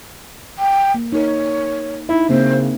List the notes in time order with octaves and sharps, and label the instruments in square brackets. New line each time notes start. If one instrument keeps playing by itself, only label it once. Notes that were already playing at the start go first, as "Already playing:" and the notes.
[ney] G5
[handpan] A#3
[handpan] D#4 A#4 [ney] C#5
[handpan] D#4 E5 [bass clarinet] E4
[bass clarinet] C#3 [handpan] A#3 C4 D4 [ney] C5